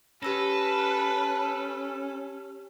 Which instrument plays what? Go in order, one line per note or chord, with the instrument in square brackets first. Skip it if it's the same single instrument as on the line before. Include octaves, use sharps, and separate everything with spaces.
[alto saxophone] C#4 [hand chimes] G4 E6 A#6 [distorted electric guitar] A4 [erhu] B4